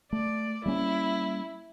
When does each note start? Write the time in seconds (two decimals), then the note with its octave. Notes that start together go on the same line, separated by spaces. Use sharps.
0.13 A3 D5
0.66 G3 A#3 C#4 E4